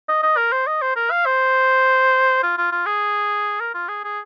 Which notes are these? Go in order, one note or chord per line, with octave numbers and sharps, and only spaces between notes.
D#5
D#5
A#4
C5
D#5
C5
A#4
F5
C5
F4
F4
F4
G#4
A#4
F4
G#4
G#4